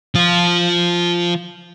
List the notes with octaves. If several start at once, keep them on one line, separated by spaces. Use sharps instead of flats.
F3 F4